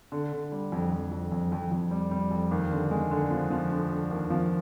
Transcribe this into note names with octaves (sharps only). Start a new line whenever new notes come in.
D3
D3
G3
F2
F2
F2
F2
F2
F2
G3
G3
F2
D#2
D3
G#3
D3
F3
F3
D3
D3
D#2
F3